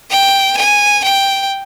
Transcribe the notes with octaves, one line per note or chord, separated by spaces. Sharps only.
G5
G#5
G5